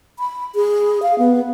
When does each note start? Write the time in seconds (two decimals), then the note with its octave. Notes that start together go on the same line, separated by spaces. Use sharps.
0.19 B5
0.55 G#4
1.02 F5
1.18 B3